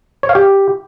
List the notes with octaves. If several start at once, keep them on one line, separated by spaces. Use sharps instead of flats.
C#5
F5
G4